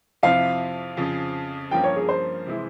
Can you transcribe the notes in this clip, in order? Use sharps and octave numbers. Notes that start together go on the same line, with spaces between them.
F2 C3 F3 C4 E4 F5
F2 C#3 F3
G2 F3 A#3 C#4 G5
C#5
G#4
C5
C3 E3 G#3 E4